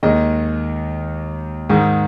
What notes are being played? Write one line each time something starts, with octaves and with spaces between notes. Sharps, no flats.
D#2 D#3 G#3 D#5
G#2 D#3 G#3